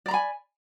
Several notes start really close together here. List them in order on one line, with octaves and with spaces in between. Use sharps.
D5 A#5 B5 G#5